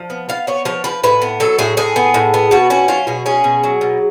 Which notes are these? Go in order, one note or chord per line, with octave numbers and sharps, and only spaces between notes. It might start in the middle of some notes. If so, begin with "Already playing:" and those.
Already playing: F3
B3
B3 F5
B3 C#5
F3 C#5
F3 B4
A2 B4
B3
F#3 A4
A2 G#4
A2 G#4
B3
A2
B3
B2 F#4
C#4 F#4
F#3 F4
B2 G#4
C#4 G#4
B2
F#3
B2